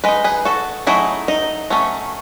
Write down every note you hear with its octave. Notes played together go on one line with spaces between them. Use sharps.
G#3 D#4 B4 D#5
G#4 B4
F#4 A4
F#3 A3 D#4 E4 G#4
D#4
F#3 A3 C#4